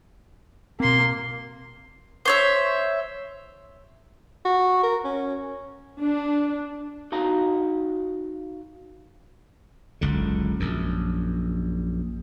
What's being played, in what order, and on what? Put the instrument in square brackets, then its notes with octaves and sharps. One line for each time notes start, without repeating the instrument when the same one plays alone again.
[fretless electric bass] B2 C4 [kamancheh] A#3 C6
[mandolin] C5 C#5 E5
[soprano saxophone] F#4
A#4
C#4
[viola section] D4
[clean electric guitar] D#4 F#4 F5 A#5
[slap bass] F#1 C#2 D3
A#1 F#2